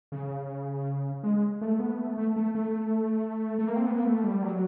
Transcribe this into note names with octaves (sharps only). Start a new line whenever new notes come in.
C#3
G#3
A3
B3
A3
A3
A3
A3
A3
A#3
C4
B3
A#3
A3
G3
F#3